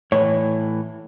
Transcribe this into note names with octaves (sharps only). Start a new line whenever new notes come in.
A2 E3 C#5